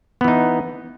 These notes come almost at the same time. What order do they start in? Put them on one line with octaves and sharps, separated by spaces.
B3 E3 D#4